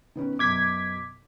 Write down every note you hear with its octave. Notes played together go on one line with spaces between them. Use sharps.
D#3 B3 C#4
F#2 B2 D6 G#6 B6